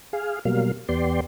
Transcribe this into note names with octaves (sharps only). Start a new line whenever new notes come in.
G#4 F5
B2 F#3 G3 A#3 F5
E2 B3 G4 D5 C6